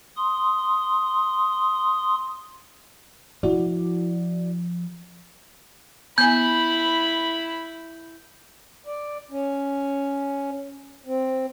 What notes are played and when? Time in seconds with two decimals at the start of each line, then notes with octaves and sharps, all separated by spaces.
0.17 C6 D#6
3.43 F3 E4 F#4 D5
6.18 B3 E4 G#5 B5 G6
8.86 D5
9.31 C#4
11.06 C4